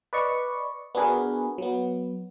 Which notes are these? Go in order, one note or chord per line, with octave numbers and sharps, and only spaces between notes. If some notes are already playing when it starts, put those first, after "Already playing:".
B4 D5 D#5 C#6
B3 D4 F#4 G#4 A#4 B4
F#3 B3